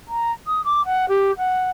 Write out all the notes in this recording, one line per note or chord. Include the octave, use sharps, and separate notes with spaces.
A#5
D#6
D6
F#5
G4
F#5